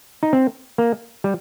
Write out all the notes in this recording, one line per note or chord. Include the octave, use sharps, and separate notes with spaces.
D#4
C4
A#3
G3